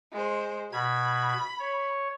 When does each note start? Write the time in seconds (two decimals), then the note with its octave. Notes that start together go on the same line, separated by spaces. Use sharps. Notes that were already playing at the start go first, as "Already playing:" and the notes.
0.12 G#3 C5
0.72 B2 B5 G#6
1.59 C#5